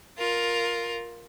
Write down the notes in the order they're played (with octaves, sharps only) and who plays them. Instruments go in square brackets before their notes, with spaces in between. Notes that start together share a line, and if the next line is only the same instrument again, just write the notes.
[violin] F4 A#4